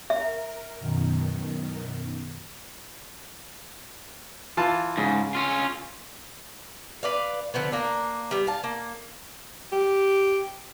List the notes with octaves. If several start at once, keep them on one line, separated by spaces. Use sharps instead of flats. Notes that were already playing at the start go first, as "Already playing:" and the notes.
A#4 E5
F#2 B2 D#3
E3 F4 A5
G#2 C#3
C#4 F4
B4 D5 F5
D3 F3 B3
A#3 D4
G3 B3
F5 A5
A#3
G4